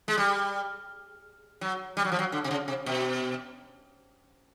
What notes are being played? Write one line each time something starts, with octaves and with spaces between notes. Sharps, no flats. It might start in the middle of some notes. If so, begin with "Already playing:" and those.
G#3
G3
F#3
G3
F#3
F3
F#3
D3
C3
C#3
C3
B2